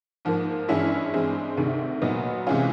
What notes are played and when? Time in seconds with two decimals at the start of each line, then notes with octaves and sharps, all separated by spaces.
0.25 G#2 F3 A#3
0.68 G2 E3 G#3 C#4 E4
1.13 G2 E3 G#3 C4
1.57 D2 C3 D#3
2.02 A#2 F#3 B3 D#4
2.47 C3 E3 G#3 C#4 F4